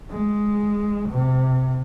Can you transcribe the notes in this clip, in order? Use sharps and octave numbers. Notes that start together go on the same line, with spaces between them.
G#3
C3